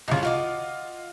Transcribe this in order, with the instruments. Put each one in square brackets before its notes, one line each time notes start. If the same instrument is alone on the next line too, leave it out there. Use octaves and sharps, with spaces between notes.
[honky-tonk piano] C2 C#3 [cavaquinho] D#4 F4
[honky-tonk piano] F4 [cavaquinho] F#4 D#5 D6